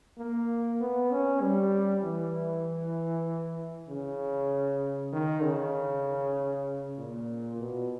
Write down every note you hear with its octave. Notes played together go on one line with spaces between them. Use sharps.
A#3
B3
C#4
G3
E3
C#3
D#3
C#3
A#2
B2